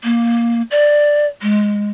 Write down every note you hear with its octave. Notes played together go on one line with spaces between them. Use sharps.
A#3
D5
G#3